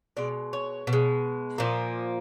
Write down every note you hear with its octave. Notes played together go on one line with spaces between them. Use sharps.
B2 G#3 D5
C#5
B2
G#3
A#2 F3 A#3